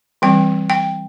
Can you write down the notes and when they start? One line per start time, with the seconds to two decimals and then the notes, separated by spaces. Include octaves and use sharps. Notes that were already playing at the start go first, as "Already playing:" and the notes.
0.22 E3 G3 C4 G5
0.70 G5